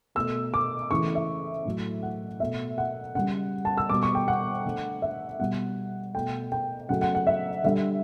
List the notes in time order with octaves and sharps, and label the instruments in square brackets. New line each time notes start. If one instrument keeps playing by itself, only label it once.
[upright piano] B2 A3 E6
D6
C#3 E3 A3 C#6
E5
A2 F#3 A3
F#5
B2 A3 E5
F#5
C#3 G3 F#5
A5
E6
B2 G3 D6
C#6
G5
F#5
D3 A3
E5
B2 G3 F#5
B2 A3 G5
G5
C#3 F#3 A3 F#5
F#5
F#5
E5
D3 G3 E5